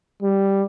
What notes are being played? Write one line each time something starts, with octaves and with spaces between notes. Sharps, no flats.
G3